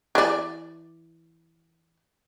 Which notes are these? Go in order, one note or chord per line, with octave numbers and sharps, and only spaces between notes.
E3 D5